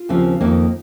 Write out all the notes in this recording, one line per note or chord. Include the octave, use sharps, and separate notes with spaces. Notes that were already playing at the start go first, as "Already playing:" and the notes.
Already playing: F4
D#2 C#3 F3 C4
F2 D#3 A#3 D#4